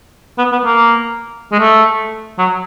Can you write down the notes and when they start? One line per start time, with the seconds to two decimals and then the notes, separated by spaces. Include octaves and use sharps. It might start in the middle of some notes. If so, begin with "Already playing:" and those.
0.38 B3
0.52 B3
0.65 A#3
1.52 G#3
1.59 A3
2.38 F#3